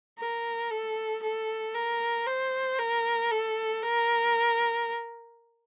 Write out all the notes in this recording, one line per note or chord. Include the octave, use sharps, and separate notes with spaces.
A#4
A4
A4
A#4
C5
A#4
A4
A#4